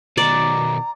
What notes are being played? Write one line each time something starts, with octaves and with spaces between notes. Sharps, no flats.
B2 D#3 D5 A#5